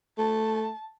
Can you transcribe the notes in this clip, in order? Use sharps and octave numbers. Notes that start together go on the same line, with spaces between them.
A3 A5